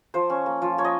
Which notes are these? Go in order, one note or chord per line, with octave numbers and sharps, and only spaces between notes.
F3 C5
C#4
A#3
F3
A#3 C#5
D#5